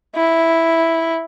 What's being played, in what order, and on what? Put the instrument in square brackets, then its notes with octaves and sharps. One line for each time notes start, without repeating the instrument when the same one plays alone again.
[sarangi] E4